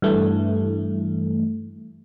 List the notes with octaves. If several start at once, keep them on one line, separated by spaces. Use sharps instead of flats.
G2 E3 A3